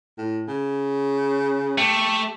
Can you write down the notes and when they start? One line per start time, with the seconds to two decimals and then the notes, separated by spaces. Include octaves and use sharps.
0.18 A2
0.48 C#3
1.78 A3 G4